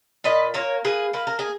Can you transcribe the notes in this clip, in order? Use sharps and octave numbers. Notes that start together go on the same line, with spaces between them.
A#2 B4 D#5
A#3 A#4 C#5
A#3 G#4 B4
A#3 B4
A#4
G#4